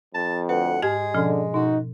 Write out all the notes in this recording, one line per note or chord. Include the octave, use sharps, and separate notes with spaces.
F2 A5
D2 B4 F#5
G#2 G#3 G4 G#4 G#6
B2 D3 F3 C#4
B2 D#4 F#4